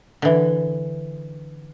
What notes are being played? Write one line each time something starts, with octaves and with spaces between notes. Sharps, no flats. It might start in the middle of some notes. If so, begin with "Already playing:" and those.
D3 E3